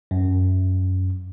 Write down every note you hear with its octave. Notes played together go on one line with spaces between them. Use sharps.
F#2